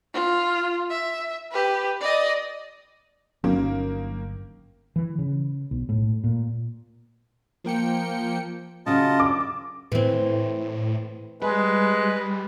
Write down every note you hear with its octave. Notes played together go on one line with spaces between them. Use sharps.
F4
E5
G4 B4
D5 D#5
G1 D#3 F#3 A#3 C#4
E3
C#3
B1
A2
A#2
F3 A#3 G5 C#7
C#3 F#3 C#4 F4 D#5 A5
D6
A2 E3 C4
G3 G#3 B4